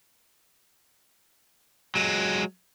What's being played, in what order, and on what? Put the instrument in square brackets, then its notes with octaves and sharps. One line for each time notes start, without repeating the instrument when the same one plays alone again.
[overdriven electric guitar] F#3 G#3